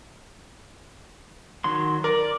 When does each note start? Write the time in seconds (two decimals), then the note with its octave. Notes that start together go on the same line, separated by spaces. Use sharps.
1.64 D#3 F#3 C6
2.04 A#4 D5